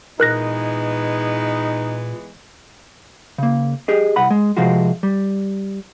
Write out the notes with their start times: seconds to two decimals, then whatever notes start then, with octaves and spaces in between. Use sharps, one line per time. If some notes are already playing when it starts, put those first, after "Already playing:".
0.20 A#2 E3 G#3 B3 D#4 A#4 F#6 A#6
3.38 C#3 A#3
3.88 G4 G#4 D#5
4.16 C2 F#5 B5
4.31 G#3
4.57 C3 F3 G#3 F4 F#4
5.03 G3